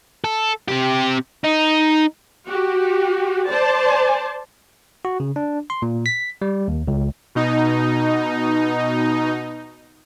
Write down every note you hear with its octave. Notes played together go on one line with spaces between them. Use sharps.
A4
C3 G4
D#4
F#4 G4
C5 D5 A5
F#4
C#3
D4
C6
A#2
B6
G3
D#2
C#2
B2 D#4